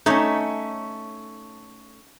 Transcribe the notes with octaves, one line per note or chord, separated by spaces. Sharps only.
A3 C#4 D#4 C#5